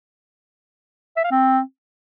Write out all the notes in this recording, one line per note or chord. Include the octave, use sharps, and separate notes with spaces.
E5
F5
C4